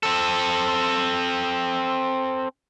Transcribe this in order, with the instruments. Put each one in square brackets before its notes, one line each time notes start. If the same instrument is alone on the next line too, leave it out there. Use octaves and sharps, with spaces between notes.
[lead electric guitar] C4 A4